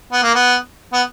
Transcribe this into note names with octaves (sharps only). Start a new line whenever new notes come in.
B3
A#3
B3
B3